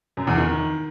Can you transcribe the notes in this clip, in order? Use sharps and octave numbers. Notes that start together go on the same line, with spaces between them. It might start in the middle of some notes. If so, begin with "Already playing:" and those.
F#2
E2
D#3